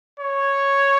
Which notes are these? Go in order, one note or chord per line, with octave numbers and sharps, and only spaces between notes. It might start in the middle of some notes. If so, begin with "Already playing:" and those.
C#5